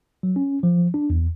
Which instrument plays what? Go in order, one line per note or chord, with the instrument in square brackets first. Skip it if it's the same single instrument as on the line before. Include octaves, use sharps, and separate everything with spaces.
[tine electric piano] F#3
C#4
F3
D4
E2